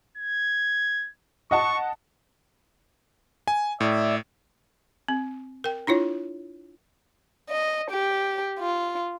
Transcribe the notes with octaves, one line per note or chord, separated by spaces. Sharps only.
G#6
D#5 F#5 A5 C#6
G#5
A2 D5 E5
C4
A#4 G5
D4 E4 F4 C#5
D#5
G4
F4